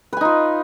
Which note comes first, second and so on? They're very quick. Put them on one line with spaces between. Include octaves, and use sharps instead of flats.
B4 G#5 D#4 F4